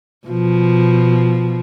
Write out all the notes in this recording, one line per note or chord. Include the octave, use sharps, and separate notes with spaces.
B2 F3